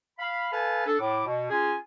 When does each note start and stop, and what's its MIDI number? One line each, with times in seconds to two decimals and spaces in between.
0.19 0.47 77
0.19 0.47 83
0.52 0.86 69
0.52 0.86 71
0.52 0.86 77
0.52 0.86 80
0.52 0.86 81
0.86 0.98 62
0.86 0.98 69
0.99 1.23 45
0.99 1.23 86
1.26 1.47 47
1.50 1.74 61
1.50 1.74 65
1.50 1.74 68
1.50 1.74 80